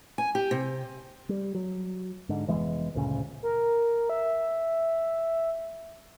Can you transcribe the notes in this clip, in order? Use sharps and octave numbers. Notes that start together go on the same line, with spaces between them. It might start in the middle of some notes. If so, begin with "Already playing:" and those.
G#5
G4
C3
G3
F#3
G#2 D3
F1 E3 G#3 B3
F#1 D2 A#2 C#3
A#4
E5